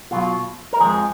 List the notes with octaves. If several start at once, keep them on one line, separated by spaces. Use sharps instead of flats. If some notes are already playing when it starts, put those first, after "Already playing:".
B2 F#3 F4
A#4
F2 F3 G#3 G#4